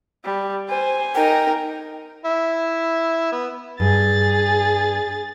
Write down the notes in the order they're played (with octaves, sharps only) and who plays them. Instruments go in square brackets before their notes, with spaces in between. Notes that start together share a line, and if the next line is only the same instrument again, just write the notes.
[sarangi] G3
[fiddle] C5 [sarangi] G#5
[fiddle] D#4 A#4 [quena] G5
[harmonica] E4
B3
[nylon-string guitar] G2 [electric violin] G#4 A6